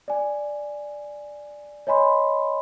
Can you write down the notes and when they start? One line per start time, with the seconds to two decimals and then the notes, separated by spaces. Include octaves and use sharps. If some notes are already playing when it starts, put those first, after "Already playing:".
0.08 D5 G#5
1.87 C#5 D#5 G#5 B5 C6